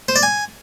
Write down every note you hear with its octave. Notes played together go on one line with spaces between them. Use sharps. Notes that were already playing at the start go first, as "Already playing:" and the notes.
C5
D5
G#5